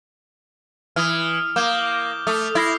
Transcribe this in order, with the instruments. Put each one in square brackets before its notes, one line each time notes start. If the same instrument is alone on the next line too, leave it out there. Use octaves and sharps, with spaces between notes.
[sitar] E3 [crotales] D#6 F6
[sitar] A#3 [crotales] D6 G6 G7
[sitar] A3 [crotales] D#6
[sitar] E4 [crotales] F6 A#6 C7